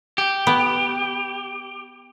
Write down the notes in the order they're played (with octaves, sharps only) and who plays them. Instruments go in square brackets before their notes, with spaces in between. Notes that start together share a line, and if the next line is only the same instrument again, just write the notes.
[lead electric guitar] G4
[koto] B3